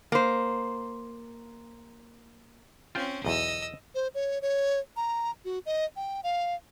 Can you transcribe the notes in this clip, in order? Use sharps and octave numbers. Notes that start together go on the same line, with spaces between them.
A#3 C5
C4 C#4 F4 G5
B1 E2 D#5 E6
C5
C#5
C#5
A#5
F#4
D#5
G5
F5